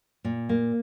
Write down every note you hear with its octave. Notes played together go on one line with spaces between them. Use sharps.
A#2
A#3